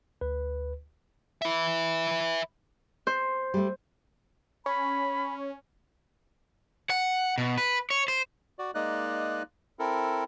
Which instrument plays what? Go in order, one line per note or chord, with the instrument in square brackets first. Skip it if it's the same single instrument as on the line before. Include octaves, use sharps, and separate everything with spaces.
[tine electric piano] D2 B4
[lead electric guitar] B4 E5
[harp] C5
[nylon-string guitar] G3 A3
[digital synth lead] C#4 [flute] B5
[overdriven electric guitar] F#5
B2
B4
C#5
C5
[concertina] F#4 D5
G#3 A#3 D#4 D5 D#5 F#6
C4 E4 A4 A#4